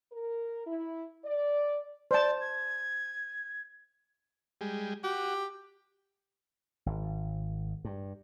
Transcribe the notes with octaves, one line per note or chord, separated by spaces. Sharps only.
A#4
E4
D5
C5 D5 A5
G#6
G3 G#3
F#4 G4
G#1
G2